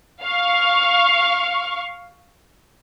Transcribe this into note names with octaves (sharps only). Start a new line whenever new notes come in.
F5 C#6